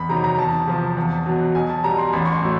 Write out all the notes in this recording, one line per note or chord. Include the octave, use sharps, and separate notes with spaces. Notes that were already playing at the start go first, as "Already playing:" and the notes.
Already playing: E2 B5
C3 D#3 F#3 A#5
A#5
E2 A5
C3 F3
E2
B2 F#3
B1 G#5
A5
B2 G3 A#5
C6
A1 B5
C#6
C6
A2 F#3